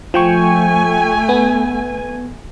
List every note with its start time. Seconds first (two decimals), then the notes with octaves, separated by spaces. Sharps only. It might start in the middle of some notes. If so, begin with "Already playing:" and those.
0.14 F3 A3 G5 G#5 C#6
1.29 B3